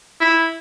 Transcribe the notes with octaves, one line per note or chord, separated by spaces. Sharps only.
E4